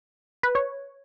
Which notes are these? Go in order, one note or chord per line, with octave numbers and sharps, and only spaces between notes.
B4
C#5